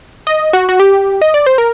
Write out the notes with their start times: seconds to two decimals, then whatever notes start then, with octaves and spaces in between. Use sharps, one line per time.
0.27 D#5
0.53 F#4
0.69 F#4
0.80 G4
1.22 D#5
1.34 D5
1.46 C5
1.58 A#4